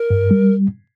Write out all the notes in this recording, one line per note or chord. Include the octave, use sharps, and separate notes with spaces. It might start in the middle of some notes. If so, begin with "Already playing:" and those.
Already playing: A#4
G2
G3